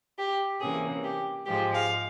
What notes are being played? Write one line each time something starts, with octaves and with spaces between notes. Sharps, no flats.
G4
C3 E3 A#3 C#4 G#4
G4
G#2 F3 G#3 G4
F5